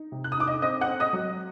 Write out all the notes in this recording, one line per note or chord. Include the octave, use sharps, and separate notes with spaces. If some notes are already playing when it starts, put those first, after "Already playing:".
Already playing: D#4
C3
F#6
D#6
D#4 D6
D#5 D#6
C4 D#5 D#6
F#5 F#6
C4
D#5 D#6
F#3